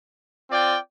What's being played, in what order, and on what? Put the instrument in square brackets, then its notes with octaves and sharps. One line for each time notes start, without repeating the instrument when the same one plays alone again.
[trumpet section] C4 F4 D5 G5